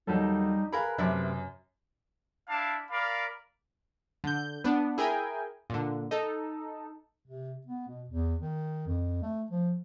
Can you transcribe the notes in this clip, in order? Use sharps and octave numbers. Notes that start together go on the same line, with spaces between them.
D#2 F#3 G3 D#4 A4
G#4 A#4 B4 F5 B5
F#2 C3 A3 D5 E5
D4 E4 F5 A5
A#4 D5 F5 B5
D3 G6
B3 D4
E4 G#4 A#4 G5 G#5
A#2 D3
D#4 A4
C3
B3
B2
E2
D#3
F2
A3
F3